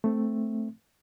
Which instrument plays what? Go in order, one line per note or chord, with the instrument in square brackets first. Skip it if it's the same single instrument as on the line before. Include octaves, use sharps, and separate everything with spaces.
[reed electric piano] A3 C4